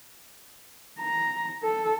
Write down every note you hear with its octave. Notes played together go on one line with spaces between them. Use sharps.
A#5
A4